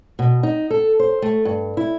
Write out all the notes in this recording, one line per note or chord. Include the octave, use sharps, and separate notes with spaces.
B2
D#4
A4
C5
A3
G2
E4